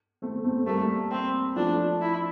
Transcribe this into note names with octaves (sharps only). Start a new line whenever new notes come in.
A3 C4
A3 C4
G3 A3 A#3
C4
F3 A3 D4
E4